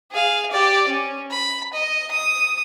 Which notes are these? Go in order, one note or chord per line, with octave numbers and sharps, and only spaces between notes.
G#4 F5
G4 D5
C#4
B5
D#5
D#6